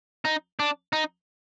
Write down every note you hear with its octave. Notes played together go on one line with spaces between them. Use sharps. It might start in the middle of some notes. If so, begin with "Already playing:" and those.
D#4
D4
D#4